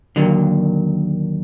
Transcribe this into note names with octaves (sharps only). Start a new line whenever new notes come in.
D#2 D3 F#3 A#3